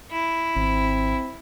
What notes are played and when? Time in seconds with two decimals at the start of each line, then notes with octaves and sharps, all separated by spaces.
0.11 E4
0.56 G#1 C4